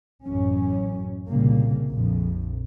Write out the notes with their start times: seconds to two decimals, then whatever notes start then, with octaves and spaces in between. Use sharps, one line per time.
0.25 A1 F#2 C#4
1.28 C2 A#2 C#3 G3 A#3
1.89 A#1 F2